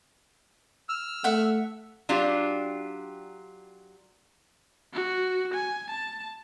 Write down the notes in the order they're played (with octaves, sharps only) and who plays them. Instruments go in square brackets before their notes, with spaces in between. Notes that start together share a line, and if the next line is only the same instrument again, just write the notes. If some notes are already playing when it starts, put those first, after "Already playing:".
[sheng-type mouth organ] E6 F6
[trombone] A3 [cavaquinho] E5 F#5
[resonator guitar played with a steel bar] F#3 D4 F4 G4
[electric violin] F#4
G#5
A5